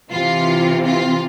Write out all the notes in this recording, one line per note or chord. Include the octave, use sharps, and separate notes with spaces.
C3 E3 F4
F4